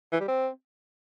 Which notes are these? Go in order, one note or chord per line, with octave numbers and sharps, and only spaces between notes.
E3
G3
C4